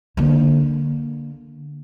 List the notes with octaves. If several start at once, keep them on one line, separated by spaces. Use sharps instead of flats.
D3 A#3